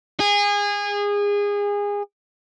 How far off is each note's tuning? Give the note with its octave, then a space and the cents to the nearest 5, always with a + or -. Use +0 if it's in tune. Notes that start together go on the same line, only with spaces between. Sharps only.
G#4 -25